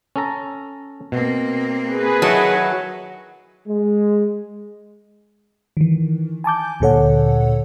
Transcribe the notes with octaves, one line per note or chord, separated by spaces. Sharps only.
C#4 A4 A#5
B2 A#3 C4
G#4 B4
D#3 F#3 D#4 E4 D#5 A5
G#3
D#3 E3
G#5 A5 D6 G6
D2 A#2 D3 A4 C#5 F#5